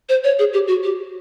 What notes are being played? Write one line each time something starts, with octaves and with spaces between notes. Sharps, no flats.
C5
C#5
G#4
G4
F#4
G4